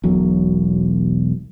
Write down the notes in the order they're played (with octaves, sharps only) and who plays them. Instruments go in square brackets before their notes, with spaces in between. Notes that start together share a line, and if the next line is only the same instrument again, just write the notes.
[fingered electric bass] E1 B1 F#3